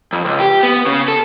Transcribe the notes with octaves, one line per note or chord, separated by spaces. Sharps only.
F2
C#2
G4
B3
C#3
A4